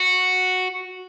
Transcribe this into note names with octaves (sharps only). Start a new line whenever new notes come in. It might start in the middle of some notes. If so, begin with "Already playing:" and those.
Already playing: F#4